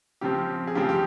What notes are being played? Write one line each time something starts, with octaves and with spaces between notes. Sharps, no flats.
C#3 F3 C4 G4
G#4
C#3 F3 C4 G4
G4